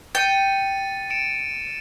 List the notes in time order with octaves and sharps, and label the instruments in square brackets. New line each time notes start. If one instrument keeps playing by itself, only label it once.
[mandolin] G5 [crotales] A6 C#7 D#7
[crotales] C#7 D7 E7